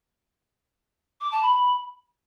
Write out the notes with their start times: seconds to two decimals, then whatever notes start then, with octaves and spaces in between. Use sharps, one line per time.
1.21 D6
1.31 A5
1.42 B5